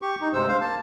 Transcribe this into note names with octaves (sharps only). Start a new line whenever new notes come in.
G4 C#6
D#4
D2 G2 C3 G#3 C5 E6
C5 F5
A#3 A5